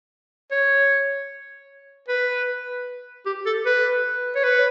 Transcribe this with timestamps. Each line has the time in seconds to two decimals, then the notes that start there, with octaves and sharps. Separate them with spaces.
0.51 C#5
2.08 B4
3.26 G4
3.46 A4
3.66 B4
4.35 C#5
4.43 B4